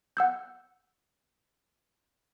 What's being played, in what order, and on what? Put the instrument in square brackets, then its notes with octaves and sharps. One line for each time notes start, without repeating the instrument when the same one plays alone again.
[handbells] F#5 E6 G6